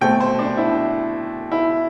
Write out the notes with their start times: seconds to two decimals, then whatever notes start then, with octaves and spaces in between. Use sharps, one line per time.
0.01 B2 A3 C4 G5
0.20 C5
0.39 D4
0.57 E4
1.51 E4